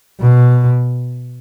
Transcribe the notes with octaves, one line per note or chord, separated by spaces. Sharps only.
B2